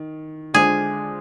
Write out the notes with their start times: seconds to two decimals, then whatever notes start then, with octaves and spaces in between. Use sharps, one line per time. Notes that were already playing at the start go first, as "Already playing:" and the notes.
Already playing: D#3
0.54 D3 G#3 D4 F4 G#4 C5